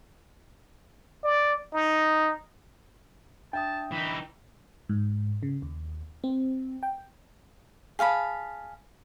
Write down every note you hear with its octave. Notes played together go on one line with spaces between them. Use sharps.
D5
D#4
D4 E5 G5 A5 D#6
E3 D#4 B5
G#2
C#3
D#2
C4
G5
G#4 F5 A5 B5